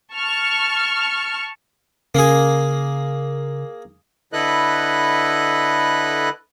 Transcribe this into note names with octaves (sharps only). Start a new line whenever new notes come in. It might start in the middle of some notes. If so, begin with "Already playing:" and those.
A5 C#6 F6
C#3 A#3 G#4
D3 E4 A4 B4 D#5 F#6